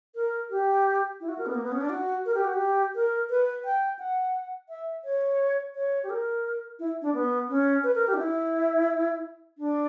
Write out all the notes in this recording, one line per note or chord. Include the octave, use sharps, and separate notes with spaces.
A#4
G4
E4
F#4
A#4
B3
A#3
B3
C#4
D4
F#4
A#4
G4
F#4
G4
A#4
B4
G5
F#5
E5
C#5
C#5
G4
A#4
E4
D4
B3
C#4
B4
A#4
G4
D4
E4
D4